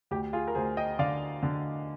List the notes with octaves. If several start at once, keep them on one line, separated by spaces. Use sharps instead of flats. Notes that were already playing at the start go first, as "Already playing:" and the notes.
D2 G4
F4 G#4
A#4
D2 G#4 C5
D#5 G5
D3 D5 F5
D3